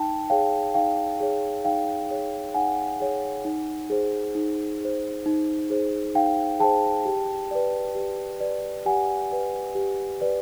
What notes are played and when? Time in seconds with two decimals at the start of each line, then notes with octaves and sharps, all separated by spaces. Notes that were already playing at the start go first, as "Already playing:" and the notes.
Already playing: D#4 G5 A5
0.30 G#4 C#5 F5 G5
0.74 D#4 F5 G5
1.20 G#4 C#5
1.65 D#4 F5 G5
2.10 G#4 C#5
2.54 D#4 F#5 G#5
3.00 G#4 C#5
3.45 D#4
3.90 G#4 C5
4.35 D#4
4.81 G#4 C5
5.26 D#4
5.70 G#4 C5
6.15 D#4 F5 G5
6.60 G#4 C5 G5 A5
7.05 G4
7.51 B4 D5
7.95 G4
8.41 B4 D5
8.86 G4 F#5 G#5
9.31 B4 D5
9.75 G4
10.21 B4 D5